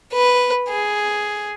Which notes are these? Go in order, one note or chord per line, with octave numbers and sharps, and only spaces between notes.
B4
G#4